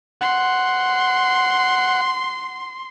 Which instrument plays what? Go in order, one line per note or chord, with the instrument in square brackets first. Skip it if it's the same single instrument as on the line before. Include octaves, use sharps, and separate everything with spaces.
[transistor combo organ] F#5 [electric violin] C6